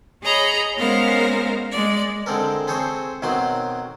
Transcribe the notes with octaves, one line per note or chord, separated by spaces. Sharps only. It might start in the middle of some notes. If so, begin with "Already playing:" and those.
G#4 C#5 D#5 A#5 B5
G#3 B3 C#4 A#4 C5 F5
G#3 D5
D3 G#3 C4 A4 A#4
C4 G#4 A4 C5 C#5
B1 D#3 F#3 C4 C6